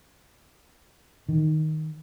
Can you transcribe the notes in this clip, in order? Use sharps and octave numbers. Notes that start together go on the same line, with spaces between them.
D#3